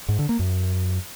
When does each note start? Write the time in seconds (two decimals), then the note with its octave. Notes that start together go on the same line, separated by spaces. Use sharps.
0.09 G#2
0.19 D3
0.29 A#3
0.39 F#2